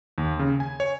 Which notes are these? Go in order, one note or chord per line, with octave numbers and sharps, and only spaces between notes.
D#2
C#3
G#5
C#5